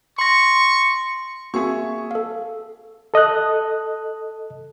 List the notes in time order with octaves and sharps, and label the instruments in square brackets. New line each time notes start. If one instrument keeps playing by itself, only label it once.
[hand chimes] C6 A#6 [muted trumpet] C#6
[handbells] A#3 C4 F#4 [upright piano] G#4 E5 C#6
[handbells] A4 F5
[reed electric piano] A4 D#5 D#6 F#6